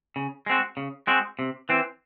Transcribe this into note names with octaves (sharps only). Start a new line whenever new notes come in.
C#3
G#3 C4 F#4
C#3
G#3 C4 F#4
C3
E3 C4